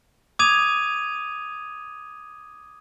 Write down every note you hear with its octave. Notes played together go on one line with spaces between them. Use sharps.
D6 D#6 G#6 D#7 F7